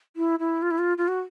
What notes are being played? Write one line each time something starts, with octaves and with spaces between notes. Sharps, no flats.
E4
E4
F4
E4
F4
F4
F#4